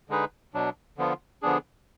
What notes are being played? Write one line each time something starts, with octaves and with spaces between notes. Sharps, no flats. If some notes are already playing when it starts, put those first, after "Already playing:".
D3 G#3 D#4 G#4 B4
B2 F#3 D4
D3 F3 B3 F4
D3 F3 B3 D4 G#4